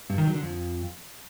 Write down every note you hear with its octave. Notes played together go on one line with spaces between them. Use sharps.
G2
D#3
F#3
D3
F2